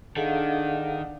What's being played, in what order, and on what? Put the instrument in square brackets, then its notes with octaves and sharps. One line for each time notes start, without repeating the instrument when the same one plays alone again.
[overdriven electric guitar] D#3 [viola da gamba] D4 [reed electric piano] G#4 A4 [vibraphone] F5 F#5